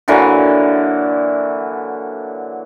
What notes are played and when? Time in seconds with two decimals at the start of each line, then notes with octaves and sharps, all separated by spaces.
0.08 D3 E3 F#3 A#3